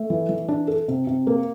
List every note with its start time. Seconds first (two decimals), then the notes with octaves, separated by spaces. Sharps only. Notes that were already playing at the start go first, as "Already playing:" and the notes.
Already playing: A3
0.10 E3
0.29 E3
0.48 D4
0.68 A4
0.88 C3
1.07 C3
1.27 A#3